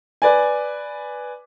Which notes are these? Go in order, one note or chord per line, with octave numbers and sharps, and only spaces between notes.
B4 D5 G#5